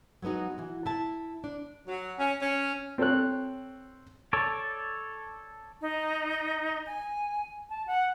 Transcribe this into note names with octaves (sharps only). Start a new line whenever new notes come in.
F#3 G#3 B3 D#4 F#4
E3 F#4
E4 A5
D4
F#3
C#4
C#4
C4 A4 C5 C#5 F#6
A4 C#5 D5
D#4
G#5
A5
F#5